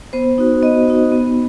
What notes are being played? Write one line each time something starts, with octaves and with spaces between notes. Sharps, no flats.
B3 C5
D#4 F#4
B3 D#5
D#4 F#4
B3